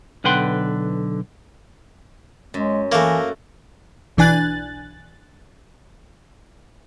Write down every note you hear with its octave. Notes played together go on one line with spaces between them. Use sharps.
B1 D3 B4 F#5 G5 C6
F#2 G#3
E3 A3 A#3 F#4
B1 E3 D4 G#5 F#6 A6